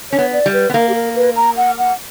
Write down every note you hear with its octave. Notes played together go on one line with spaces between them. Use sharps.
C#4 C#5
B3
D5
G3
B4
B3
A#3 A#4
G4
A#4
B4
A#5
F#5
F#5